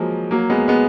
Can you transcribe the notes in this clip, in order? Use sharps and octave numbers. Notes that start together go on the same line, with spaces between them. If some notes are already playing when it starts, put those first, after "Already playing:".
Already playing: F3 F#3 G#3 A#3
F#3 A#3
G#3 B3
G#3 B3